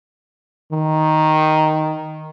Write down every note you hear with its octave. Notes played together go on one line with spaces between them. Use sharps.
D#3